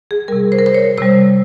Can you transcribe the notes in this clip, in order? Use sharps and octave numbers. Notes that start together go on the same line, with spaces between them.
G#4
C3 G3 A#4
C5
A#4
C5
C#5
C3 G3 C5